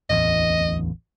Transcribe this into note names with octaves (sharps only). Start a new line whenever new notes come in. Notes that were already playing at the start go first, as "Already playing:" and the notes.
D1 A1 E2 D#5